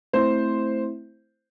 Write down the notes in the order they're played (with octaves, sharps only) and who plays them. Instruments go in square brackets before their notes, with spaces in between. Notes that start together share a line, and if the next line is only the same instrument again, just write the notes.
[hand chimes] A3 C4 E4 [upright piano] C5